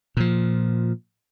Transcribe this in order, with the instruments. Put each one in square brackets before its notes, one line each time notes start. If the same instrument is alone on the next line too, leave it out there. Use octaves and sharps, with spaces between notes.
[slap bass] A#2 F3